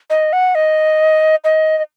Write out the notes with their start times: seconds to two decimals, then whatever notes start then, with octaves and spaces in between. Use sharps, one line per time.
0.10 D#5
0.33 F#5
0.55 D#5
1.44 D#5
1.78 D#5